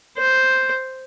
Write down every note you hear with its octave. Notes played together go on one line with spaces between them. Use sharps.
C5